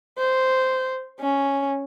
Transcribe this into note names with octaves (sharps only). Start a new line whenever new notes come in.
C5
C#4